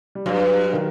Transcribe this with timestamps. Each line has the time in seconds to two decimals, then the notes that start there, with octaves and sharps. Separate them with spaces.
0.15 G3
0.26 G2 F#3
0.73 D#3